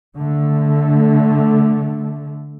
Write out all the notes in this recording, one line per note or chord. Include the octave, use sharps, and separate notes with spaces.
D3 A3